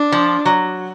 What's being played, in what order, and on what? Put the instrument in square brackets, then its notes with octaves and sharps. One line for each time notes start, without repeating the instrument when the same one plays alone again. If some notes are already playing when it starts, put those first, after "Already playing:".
Already playing: [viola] D4
[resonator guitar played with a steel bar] F3
F#3